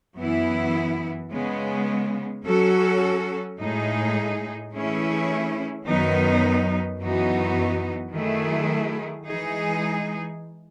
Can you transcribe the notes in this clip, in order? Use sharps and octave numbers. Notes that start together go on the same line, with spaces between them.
F#2 E3 B3 E4
C#3 G#3 B3
F#3 C#4 F#4 A4
A2 G#3 D#4 G#4
E3 A3 C#4 E4 G#4
F#2 D#3 F#3 B3 D#4
F#2 E3 B3 D#4 F#4
D#3 F#3 A3 E4 G#4
E3 G#3 D#4 G#4